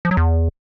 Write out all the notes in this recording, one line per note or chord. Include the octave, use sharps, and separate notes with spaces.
F3
F#3
E2